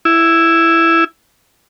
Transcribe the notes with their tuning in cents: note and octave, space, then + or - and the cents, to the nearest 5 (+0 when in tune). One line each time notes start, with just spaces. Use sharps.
E4 +5